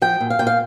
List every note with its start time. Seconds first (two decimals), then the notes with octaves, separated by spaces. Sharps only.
0.02 F3 G5
0.20 A#2
0.30 F5
0.39 A#2 G5
0.47 F5